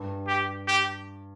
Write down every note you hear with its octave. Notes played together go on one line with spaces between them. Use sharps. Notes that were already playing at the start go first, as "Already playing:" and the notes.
Already playing: G2
G4
G4